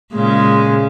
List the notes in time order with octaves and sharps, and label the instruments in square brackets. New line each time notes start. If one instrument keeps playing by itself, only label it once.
[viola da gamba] A#2 C#3 G#3